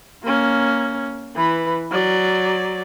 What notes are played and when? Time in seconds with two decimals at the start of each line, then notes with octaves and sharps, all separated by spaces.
0.23 A#3 C#4
1.36 E3 B4
1.91 F#3 D5